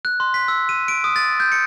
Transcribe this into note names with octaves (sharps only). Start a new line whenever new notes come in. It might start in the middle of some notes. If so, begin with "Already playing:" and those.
F#6
C6
B6
E6
D#7
D7
D#6
A6
G6
C#7